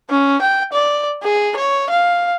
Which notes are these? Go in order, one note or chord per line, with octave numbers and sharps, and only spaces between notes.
C#4
G5
D5
G#4
C#5
F5